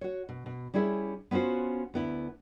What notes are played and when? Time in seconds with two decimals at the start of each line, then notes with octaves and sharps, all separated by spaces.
0.01 F#4 C#5
0.29 B2
0.46 B2
0.74 G3 C#4 E4 G#4 E5
1.31 B3 C#4 F4 F#4 C5
1.94 D2 B3 E4